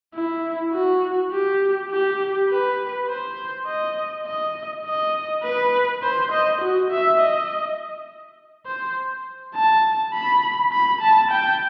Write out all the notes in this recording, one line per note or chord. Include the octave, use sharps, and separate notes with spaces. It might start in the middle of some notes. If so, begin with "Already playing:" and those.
E4
F#4
G4
G4
B4
C5
D#5
D#5
D#5
B4
C5
D#5
F#4
E5
D#5
C5
A5
B5
B5
A5
G5